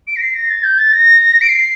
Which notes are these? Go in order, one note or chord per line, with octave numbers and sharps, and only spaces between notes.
D7
A#6
C7
A#6
A6
G6
A6
A#6
D7
C7